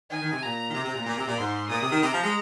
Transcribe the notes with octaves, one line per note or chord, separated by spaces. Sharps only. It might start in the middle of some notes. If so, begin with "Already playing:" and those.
D#3 G#5
D#3
C3
A#2 A#5
D#3
C3 A#5
C3
A#2
A#2
C3
A#2
G#2 C6
A#2 D#6
C3
D#3
C3 A#5
F3
G#3